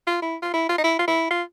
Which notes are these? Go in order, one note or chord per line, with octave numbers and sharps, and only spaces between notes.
F4
E4
F4
E4
F4
D#4
E4
F4
E4
F4